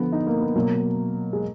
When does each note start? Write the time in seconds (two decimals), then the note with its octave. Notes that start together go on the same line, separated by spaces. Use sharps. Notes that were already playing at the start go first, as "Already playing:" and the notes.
Already playing: D3 F3 B3
0.12 D#4
0.27 A#3
0.41 B3
0.55 B2 F#3 A#3
1.33 G#3